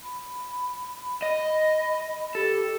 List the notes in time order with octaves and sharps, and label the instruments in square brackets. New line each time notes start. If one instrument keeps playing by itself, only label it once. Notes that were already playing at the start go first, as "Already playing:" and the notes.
[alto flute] B5
[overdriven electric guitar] D#5
[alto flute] G4 [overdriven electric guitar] A4